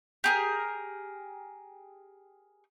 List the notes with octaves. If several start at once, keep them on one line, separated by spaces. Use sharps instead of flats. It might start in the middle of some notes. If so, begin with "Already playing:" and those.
G4 G#4 A#4